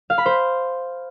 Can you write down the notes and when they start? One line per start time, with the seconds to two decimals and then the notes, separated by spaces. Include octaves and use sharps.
0.10 F5
0.18 B5
0.26 C5